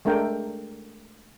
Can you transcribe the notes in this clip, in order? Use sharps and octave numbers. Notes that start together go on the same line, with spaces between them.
G#3 A3 D4 A#4 G5